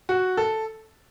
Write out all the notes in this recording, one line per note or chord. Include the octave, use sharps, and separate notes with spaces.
F#4
A4